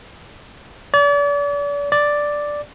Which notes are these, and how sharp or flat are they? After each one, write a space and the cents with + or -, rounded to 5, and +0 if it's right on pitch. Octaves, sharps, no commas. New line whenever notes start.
D5 -40
D5 +0